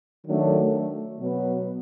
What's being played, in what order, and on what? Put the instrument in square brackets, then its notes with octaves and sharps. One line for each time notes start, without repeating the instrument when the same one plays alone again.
[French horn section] D#3 F#3 A3 D4
B2 F#3 B3